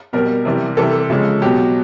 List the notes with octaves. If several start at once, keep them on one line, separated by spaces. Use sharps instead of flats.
B2 G3 A#4
C3 E3 G3
C3 E3 G3 A4
C#3 F3 G#3
B2 F#3 G4